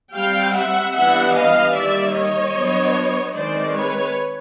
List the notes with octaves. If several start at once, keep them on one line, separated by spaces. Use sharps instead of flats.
G3 C4 F5 G5
E5 F#5
E3 G3 B3 D4 E5 F#5
D#5 F5
D#3 G3 A#3 D5 E5
C#5 D#5
F#3 B3 D4
D#3 G#3 C4 C5 D5
B4 C#5